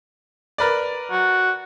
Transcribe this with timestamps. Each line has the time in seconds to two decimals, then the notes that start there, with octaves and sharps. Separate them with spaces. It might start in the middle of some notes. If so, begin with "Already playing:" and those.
0.58 A#4 B4 D5
1.11 F#4